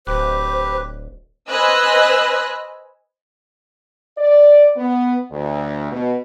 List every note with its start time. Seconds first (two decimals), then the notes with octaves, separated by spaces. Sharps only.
0.07 D1 G4 B4 C5
1.48 B4 C5 D#5 G#5 E6 F#6
4.18 D5
4.76 B3
5.32 D2
5.92 B2